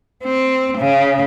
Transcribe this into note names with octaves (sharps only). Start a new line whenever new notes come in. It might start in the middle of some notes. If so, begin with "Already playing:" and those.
C4
C#3